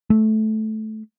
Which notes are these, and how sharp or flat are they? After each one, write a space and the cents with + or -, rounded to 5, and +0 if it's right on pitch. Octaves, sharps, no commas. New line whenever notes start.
A3 -15